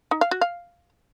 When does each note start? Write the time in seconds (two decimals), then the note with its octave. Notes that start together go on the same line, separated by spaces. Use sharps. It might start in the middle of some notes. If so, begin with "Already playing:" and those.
0.11 D#4
0.21 F5
0.31 F#4
0.41 F5